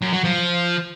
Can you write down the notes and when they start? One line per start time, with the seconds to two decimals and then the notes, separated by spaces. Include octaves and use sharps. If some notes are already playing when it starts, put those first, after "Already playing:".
0.02 F#2
0.13 F#3
0.24 F3